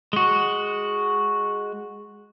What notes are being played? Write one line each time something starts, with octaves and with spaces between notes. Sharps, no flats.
G#3 F#4